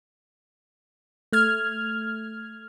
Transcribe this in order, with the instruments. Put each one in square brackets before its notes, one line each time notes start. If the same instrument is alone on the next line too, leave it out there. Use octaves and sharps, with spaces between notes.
[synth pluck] A3 F6 G#6